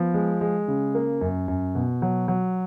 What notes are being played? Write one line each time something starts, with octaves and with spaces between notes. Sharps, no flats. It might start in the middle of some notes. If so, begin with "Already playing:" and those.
Already playing: F3 B3
G#3
G#3
C#3
A#3
F#2
F#2
B2
F#3
F#3